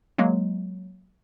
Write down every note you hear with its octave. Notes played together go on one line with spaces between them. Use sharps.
F#3 G#3 A#3